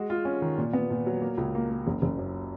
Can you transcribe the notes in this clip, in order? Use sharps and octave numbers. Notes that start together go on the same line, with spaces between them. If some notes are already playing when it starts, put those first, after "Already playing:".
Already playing: G#3 F#4
F4
C#4
D#3
A#2
B3
A#2
F#3
A#3
C#2
A#3
A#3
F#1
F#1
F#2